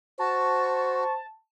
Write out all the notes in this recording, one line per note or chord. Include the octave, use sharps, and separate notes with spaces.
F#4 C5 A5 C#6